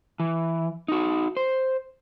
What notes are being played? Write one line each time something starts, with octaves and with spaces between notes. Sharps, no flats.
E3
D#4 F#4
C5